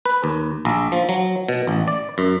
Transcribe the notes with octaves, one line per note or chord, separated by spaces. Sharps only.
B4
D#2
A#1
F3
F#3
B2
A1
D5
F#2